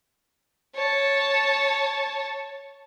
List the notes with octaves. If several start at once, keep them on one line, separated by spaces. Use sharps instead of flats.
C#5 A5